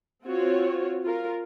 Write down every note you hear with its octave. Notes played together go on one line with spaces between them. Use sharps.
C4 F4 F#4 C#5
F4 A#4